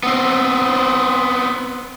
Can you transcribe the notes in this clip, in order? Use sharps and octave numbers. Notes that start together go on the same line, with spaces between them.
B3 C4